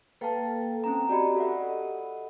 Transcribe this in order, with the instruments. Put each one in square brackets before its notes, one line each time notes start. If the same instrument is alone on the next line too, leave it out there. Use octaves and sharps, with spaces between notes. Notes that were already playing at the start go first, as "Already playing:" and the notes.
[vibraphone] A#3 A4 G5 [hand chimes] B4 F5 A5
[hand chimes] C4 C#4 A#5
[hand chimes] F#4 G4 [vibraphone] D5 D#5 B5
[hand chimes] A4 E5 F#5
[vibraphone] D#5